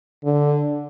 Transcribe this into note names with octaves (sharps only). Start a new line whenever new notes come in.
D3